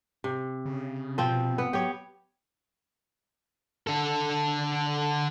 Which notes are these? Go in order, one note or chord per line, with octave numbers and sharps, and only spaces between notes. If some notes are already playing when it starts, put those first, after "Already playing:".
C3
C#3
B2 F3 C4
B3
F#3 G4 C#5
D3 A4